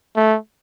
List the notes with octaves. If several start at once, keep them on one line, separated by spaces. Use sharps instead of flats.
A3